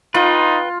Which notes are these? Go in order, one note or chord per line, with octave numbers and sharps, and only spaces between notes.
D#4 F4 B4 G5